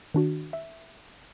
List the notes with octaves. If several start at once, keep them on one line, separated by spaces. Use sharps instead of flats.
D#3 D4 F#4
E5